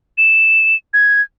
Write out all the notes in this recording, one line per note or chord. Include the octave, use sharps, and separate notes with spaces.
E7
G#6